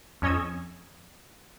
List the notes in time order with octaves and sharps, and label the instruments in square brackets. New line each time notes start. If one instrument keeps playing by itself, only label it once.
[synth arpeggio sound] F2 C#4 C#5 D#5 E6 G#6